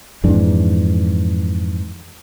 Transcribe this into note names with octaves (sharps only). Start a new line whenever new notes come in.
F2 G#2 E3 D4